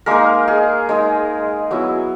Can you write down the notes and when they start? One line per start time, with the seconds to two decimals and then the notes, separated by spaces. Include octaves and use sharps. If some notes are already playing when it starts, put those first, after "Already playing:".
0.06 G#3 A#3 D#4 A#4
0.48 G#4
0.89 G#3 D#4 G#4
1.71 F#3 B3 E4